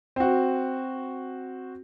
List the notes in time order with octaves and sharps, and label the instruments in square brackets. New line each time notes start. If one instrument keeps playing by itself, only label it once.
[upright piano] C4 F#4